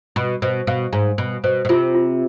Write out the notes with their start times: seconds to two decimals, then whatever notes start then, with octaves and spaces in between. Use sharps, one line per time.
0.16 B2 B5
0.42 B2 C5
0.67 B2 F5
0.93 G#2 G#5
1.18 B2 B5
1.44 B2 C5
1.65 B2
1.69 C3 F4
1.94 F4